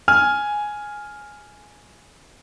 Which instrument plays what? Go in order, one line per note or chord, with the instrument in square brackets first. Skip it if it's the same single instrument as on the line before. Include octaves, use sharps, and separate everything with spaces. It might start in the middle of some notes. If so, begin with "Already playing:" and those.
[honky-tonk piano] G#5 [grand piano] F6